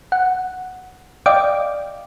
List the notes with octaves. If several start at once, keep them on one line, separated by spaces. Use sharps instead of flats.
F#5
D5 D#5 F5 G5 D6